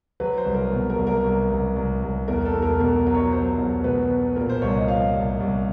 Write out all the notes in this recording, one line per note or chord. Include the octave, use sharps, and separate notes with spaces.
F#3 B4
C5
C2
A#4
B2
A#4
C2
A#4
C2
C2
C2
C2
E2 A#4
A4
E2
A#4
B2 A#4
F#3
C#5
F#3 C5
E2
B2 B4
B2
A#2 A#4
C5
C2 C#5
D#5
F3 F5
C2
C2